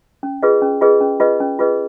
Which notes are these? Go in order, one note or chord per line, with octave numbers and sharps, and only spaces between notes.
C#4
F4 G#4 B4 D#5
C#4
F4 G#4 B4 D#5
C#4
F4 G#4 B4 D#5
C#4
F4 G#4 B4 D#5